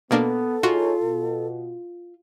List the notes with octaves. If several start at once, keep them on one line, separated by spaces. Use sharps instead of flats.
B2 A#3 B3 D4 A4
D#4 F4 F#4 G#4 C#5
B2